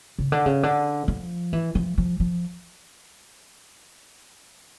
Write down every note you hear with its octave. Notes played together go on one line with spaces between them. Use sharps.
C#3
D3
C#3
D3
F3
E3
F3
F3
F3